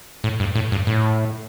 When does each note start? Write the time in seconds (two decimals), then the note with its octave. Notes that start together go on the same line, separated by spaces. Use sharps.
0.24 A2
0.40 G2
0.55 A2
0.72 G2
0.87 A2